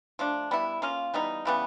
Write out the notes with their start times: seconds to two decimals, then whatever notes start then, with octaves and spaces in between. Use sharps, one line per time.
0.19 F3 A3 D4
0.51 G3 B3 E4
0.82 A#3 C#4 F4
1.14 E3 G3 B3 D#4
1.45 C#3 E3 G3 B3